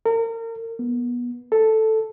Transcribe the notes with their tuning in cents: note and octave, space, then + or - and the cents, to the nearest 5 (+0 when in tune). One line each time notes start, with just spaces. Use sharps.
A#4 -35
B3 -25
A4 +0